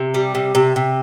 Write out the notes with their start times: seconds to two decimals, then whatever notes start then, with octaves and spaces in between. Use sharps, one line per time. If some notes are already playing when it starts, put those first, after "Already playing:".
Already playing: C3
0.14 G3
0.35 C3
0.55 C3
0.76 C3